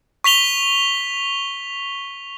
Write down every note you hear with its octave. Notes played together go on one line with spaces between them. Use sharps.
C#6 B6 F7 G7